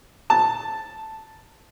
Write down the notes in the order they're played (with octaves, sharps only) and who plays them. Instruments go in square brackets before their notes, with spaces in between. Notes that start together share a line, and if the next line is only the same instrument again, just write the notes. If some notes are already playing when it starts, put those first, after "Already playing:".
[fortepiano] A5